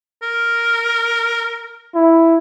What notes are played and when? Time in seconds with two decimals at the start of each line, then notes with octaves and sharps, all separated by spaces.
0.22 A#4
1.95 E4